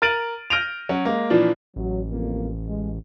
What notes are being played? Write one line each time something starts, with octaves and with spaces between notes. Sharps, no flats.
A#4 F6 A6 D7 D#7 F#7
F6 G6 A#6 D7 D#7 F7
F#3 C#4 F#4
G#3 A#3
A#2 E3 F3 D4
A1 F#3
C2 F2 A#3
G#3